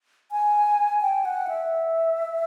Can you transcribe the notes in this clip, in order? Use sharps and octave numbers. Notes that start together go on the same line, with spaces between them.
G#5
G5
F#5
E5